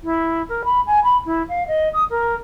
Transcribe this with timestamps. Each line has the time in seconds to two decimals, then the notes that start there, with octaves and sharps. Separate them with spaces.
0.03 E4
0.49 A#4
0.64 B5
0.86 G#5
1.03 B5
1.25 E4
1.48 F5
1.67 D#5
1.93 D#6
2.10 A#4